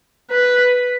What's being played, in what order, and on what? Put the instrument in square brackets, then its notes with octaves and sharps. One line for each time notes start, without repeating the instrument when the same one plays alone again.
[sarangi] B4